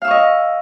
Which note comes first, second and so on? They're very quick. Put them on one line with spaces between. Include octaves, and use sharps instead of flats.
F5 E6 C#6 D#5